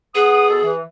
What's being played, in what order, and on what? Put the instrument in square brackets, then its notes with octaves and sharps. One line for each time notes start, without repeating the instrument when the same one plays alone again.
[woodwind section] B3 F#5 D#6 [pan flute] G#4
[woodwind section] B2 B3 A4
E3